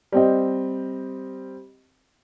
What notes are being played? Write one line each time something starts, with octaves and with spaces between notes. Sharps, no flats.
G3 C4 D#5